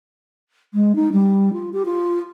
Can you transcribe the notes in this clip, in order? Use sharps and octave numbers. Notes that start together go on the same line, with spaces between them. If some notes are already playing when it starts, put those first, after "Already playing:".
G#3
D#4
G3
F4
G4
F4